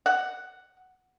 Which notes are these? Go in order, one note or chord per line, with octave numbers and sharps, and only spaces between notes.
F#5